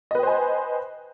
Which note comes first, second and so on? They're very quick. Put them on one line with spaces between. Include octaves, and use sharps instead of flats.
D#5 B4 G5 C5 G#5